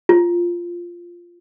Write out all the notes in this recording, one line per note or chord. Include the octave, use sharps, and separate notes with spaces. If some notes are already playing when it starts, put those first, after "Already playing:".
F4